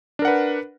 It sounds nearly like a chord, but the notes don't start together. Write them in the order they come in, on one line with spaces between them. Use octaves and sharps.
D4 A#4 F#5 B4